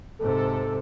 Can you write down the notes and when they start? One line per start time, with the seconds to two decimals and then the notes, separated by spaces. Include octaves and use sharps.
0.19 G#2 C3 A4